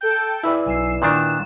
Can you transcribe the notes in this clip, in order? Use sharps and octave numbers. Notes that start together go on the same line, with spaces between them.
A4 G5 G6
E4 B4 D5 E6
B1 G#5 E6 C7
A#2 D#3 D4 F#6 E7